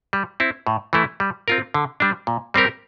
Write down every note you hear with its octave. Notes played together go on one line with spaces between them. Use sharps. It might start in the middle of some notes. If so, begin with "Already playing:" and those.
G3
C4 E4
A2
E3 A3 E4
G3
C4 F4 A#4
D3
G3 D4
A#2
G3 C4 G4 A#4